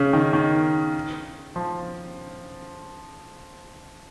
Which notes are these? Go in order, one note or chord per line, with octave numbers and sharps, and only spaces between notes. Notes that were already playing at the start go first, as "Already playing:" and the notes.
Already playing: C#3
D#3
D#3
F3